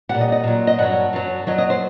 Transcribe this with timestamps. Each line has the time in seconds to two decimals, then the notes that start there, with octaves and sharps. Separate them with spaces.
0.09 G3 F#5
0.15 A#2
0.21 D#5
0.32 D#5
0.44 A#2 F#3
0.67 D#5
0.78 G2 F#3 F#5
1.13 F#2 F#3
1.47 F#2 F#3 D#5
1.58 D#5
1.70 C5